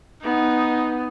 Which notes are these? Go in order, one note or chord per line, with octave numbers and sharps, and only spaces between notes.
B3 D#4